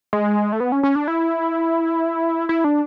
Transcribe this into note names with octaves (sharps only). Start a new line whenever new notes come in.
G#3
A3
B3
C#4
C#4
D4
E4
E4
D4